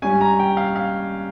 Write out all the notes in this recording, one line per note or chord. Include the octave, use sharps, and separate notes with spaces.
G2 G3 C#4 G#5
A#5
G5
F5
F5